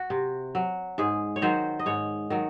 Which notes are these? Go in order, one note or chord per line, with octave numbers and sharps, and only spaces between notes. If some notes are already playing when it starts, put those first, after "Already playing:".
Already playing: F#4
C3
F#3
G#2 G#4
C#5
D#3 F#3 C5
D#5
G#2 C#5
D#3 F#3